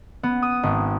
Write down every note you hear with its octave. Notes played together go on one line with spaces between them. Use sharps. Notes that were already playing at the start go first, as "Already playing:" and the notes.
B3
D#6
G#1